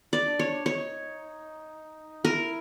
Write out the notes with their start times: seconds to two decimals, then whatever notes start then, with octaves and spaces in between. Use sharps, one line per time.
0.13 D5
0.26 D4
0.39 C#5
0.66 D#4 C#5
2.24 E4 A#4